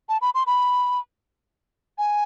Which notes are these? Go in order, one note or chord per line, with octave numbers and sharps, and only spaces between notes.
A5
B5
C6
B5
G#5